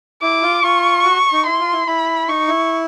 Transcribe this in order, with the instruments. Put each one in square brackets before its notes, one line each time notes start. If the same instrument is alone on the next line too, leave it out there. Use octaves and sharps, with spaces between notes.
[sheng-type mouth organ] E4 [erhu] D6
[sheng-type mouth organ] F4
[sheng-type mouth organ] F4 [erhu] C#6
[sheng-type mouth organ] F#4
D#4
[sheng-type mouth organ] E4 [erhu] C6
[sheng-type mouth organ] F4
E4
[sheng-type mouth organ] E4 [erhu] B5
[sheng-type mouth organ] D#4 [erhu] C#6
[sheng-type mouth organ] E4